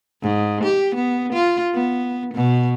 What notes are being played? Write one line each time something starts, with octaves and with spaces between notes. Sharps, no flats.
G#2
G4
B3
F4
B3
B2